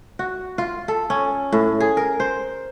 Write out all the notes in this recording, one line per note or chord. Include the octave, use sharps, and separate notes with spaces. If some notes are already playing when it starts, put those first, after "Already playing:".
F#4
F4
A4
C#4
A2
G#4
A#4
C5